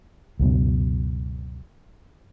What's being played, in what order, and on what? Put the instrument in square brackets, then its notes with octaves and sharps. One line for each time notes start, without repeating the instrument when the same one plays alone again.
[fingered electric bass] C#2 F#2 B2